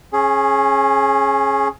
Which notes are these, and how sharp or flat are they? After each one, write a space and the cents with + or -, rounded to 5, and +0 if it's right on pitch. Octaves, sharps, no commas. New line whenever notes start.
C#4 -20 G#4 +10